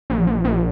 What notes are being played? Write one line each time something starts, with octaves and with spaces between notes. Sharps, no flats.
A#1
A#1
A#1